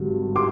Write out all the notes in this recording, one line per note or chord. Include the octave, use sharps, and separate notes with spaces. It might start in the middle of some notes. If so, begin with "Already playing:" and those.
Already playing: G#1 G2 D3 F#3
C6 D6